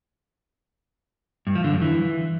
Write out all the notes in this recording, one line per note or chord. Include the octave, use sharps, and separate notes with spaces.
G2
F3
D3
F#2
E3